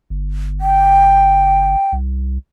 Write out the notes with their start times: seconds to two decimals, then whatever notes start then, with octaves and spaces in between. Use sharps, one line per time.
0.10 G1
0.61 G5
1.92 C2